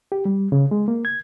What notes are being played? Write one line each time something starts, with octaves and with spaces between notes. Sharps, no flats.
G4
G3
C#3
G#3
A#3
G#6